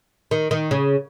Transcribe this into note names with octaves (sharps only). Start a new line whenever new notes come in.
D#3
D#3
C#3